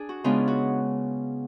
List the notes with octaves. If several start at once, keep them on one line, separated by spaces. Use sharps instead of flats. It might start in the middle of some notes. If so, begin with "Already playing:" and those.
Already playing: D4 G#4
F#4
C#3 G#3 B3 D4 F4
F#4